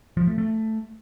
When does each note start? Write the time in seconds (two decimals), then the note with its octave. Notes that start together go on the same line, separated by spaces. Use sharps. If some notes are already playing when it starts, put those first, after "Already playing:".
0.17 F3
0.27 A3
0.38 A3